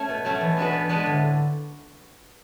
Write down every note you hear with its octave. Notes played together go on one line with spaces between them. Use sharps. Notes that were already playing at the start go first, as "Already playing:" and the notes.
Already playing: A3 C#4
B2
F#3 A3 C#4
B2 E3
G#3 D4 F#4 B4
B2
G#3 D4 F#4 B4
A2 D3